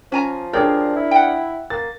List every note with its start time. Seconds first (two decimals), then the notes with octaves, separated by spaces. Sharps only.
0.12 F3 C#4 G#5 A#5
0.53 D4 G4 G#4 A#4 C#5 D5
0.96 E4
1.11 F#5 G5
1.70 A#3 A6